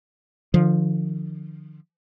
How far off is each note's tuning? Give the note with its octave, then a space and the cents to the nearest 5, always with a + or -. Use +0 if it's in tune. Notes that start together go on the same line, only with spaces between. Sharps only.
D3 +45 F3 +0